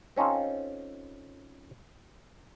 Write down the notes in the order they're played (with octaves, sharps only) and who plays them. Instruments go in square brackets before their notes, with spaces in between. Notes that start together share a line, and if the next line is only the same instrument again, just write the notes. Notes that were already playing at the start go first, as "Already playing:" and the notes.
[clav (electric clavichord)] C4 C#4 D#4 F4 A4